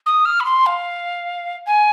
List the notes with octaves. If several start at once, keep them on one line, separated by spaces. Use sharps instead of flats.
D#6
F6
B5
C6
F5
G#5